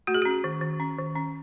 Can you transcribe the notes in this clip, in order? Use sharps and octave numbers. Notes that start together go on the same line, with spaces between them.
A3 F#4
G#4
C#4 F#4
D#3
D#3
C#4
D#3
C#4